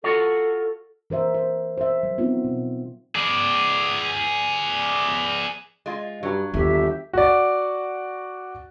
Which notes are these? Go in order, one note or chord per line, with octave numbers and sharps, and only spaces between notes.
F4 F#4 A4 C#5
E3 A#4 C5 E5
C5
C5 E5
F#3
B3 C4 D#4 F4
B2
G#4 D5
G#3 F4
G2 F#3
G1 D#2 G4 E5
F#4 D5